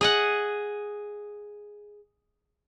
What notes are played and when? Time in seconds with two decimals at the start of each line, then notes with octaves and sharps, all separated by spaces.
0.01 G#4 D#5 F#5